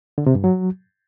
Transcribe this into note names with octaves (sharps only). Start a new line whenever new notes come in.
D3
C3
G2
F#3